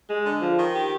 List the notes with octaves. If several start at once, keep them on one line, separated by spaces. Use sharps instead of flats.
G#3
D3
F3
D#3
G4